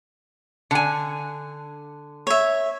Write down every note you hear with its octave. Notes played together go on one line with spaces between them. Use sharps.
D3 G#5
C#5 E5